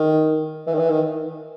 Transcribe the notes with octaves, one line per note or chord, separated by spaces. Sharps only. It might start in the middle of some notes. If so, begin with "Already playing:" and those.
Already playing: D#3
E3
D#3
E3
D#3